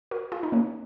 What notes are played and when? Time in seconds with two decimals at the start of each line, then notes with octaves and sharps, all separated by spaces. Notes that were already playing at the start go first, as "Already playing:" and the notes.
0.11 F#4 A#4
0.32 F4 G#4
0.43 D#4
0.52 A#3 C#4